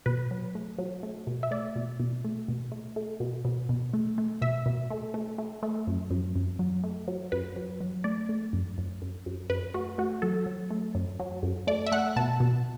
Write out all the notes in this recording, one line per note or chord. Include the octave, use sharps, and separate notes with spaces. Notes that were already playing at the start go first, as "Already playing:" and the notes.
B2 B4
F#3
A3
F#3
A3
B2
E5
A3 D5
B2
B2
A3
B2
A3
A3
B2
B2
B2
A3
A3
B2 E5
B2
A3
A3
A3
A3
F#2
F#2
F#2
F#3
A3
F#3
F#2 B4
F#3
F#3
A3 D5
A3
F#2
F#2
F#2
F#2
F#2 B4
A3 F#4
A3 F#4
F#3 A4
F#3
A3
F#2
F#3
F#2
A3 D5
E5
A3 F#5
B2 A5
B2